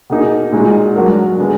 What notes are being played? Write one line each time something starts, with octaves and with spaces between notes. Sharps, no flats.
B2 A#3 D#4 G#4
A#2 G#3 D#4 F#4
G#2 F#3 D4 F#4 A#4
D3 G#3 B3